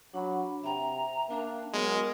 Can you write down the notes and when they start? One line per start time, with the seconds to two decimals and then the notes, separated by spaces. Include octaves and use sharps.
0.14 F#3 D4 F#5 B5
0.64 C3 E5 G5 A#5
1.29 A#3 D4
1.73 F#3 G#3 B3 A#4